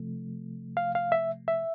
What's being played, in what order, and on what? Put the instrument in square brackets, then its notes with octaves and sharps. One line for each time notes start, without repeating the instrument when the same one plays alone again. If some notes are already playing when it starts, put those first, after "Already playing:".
Already playing: [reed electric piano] C3 F3 A3
F5
F5
E5
E5